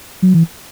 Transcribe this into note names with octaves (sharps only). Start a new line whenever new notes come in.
F#3
E3